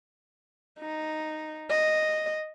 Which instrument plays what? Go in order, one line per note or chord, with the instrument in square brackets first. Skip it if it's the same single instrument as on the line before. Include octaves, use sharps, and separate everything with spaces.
[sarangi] D#4
D#5